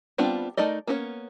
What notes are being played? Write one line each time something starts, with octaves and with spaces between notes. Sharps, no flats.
G3 B3 C4 D4 F4
A3 D#4 A#4 D5 D#5
A#3 B3 C#4 A#4 C#5